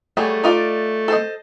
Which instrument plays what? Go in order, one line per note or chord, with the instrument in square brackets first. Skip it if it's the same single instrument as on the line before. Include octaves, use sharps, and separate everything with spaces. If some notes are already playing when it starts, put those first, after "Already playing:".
[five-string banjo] F#3 G3 G#4 [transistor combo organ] A3
[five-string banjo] D#4 F4 D5
A4 C5 D#5